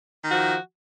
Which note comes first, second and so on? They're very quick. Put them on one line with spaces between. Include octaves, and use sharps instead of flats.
D#3 F#4 F3